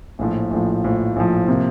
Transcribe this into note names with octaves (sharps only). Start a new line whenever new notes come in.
A#1 A2 F3
A#1 A2 F3
A#1 A2 F3
A#1 A2 F3
C3 F3 A#3